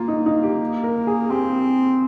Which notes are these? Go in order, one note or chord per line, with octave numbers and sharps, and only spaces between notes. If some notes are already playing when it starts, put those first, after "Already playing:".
Already playing: A#3 F4
D#4
D#4
G4
A#4
G#4
C4 G4